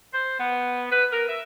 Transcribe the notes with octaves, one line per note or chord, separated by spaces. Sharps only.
C5
B3
B4
A#4
E5